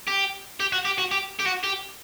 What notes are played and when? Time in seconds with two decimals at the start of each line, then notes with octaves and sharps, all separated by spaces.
0.08 G4
0.60 G4
0.73 F#4
0.85 G4
0.98 F#4
1.11 G4
1.40 G4
1.46 F#4
1.64 G4